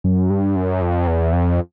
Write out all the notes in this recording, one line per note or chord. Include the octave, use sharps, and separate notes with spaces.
F#2
G2
F#2
F2
E2
F2